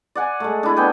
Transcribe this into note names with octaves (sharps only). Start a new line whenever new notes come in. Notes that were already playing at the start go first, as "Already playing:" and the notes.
D5 F#5 G#5
G#3 A3
D4 E4
B3 D5 G5 G#5